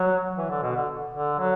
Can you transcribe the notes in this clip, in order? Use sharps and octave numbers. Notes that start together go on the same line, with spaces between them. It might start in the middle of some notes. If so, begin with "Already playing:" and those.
Already playing: F#3
E3
D3
B2
D3
D3
F#3